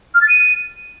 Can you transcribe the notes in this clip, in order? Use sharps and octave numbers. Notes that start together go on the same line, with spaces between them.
F6
A6
D#7